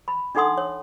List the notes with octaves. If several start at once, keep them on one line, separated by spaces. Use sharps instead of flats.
B5
D4 D#4 A4 F#5 C6 D#6
C#5